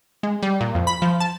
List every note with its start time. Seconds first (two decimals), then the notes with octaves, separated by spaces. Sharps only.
0.23 G#3
0.43 G3
0.61 A#2
0.75 F2
0.87 B5
1.02 F3
1.20 A5